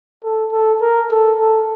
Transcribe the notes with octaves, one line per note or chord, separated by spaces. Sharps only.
A4
A4
A#4
A4
A4